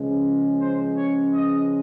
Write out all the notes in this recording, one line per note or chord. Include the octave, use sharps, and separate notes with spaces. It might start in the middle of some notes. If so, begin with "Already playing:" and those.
Already playing: C#2 C#3 F3 G#3
C5
C#5
D#5